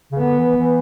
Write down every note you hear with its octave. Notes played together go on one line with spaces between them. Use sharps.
C#3
D3 B3
E3
E3